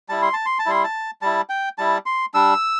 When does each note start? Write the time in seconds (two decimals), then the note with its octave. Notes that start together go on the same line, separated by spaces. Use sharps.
0.09 G3 E4 A5
0.22 C6
0.33 A5
0.46 C6
0.59 A5
0.66 G3 E4 C6
0.84 A5
1.22 G3 E4 A5
1.49 G5
1.78 G3 E4 A5
2.06 C6
2.34 G3 D4 E6